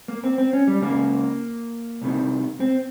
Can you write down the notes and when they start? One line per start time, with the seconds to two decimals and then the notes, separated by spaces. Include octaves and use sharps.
0.08 A#3
0.24 C4
0.38 C4
0.53 C#4
0.68 G3
0.82 C#2 C#3 A#3
2.02 C2 C3 D#3
2.60 C4